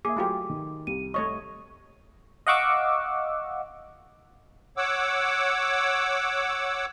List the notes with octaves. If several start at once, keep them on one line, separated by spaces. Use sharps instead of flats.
A#3 G#4 E5 D6
F#3 A3 F4 G4
D#3
C2 D#7
A3 C#5 D#5 C#6
D#5 F5 F#5 C#6 D6 E6
C#5 F#5 D6 E6